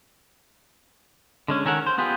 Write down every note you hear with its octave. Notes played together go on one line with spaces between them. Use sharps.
D3 G#3 C#4
D#3 C#4 A4 A#4 F#5
C5
B3 F4 G4 G#4